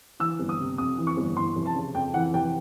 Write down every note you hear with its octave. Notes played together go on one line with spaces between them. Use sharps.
E3 E6
G1
D#6
C3
F2 D#6
E3
C#6
G1
E3 C6
F1
A5
C#3
F2 G5
E3 F#5
F1 G5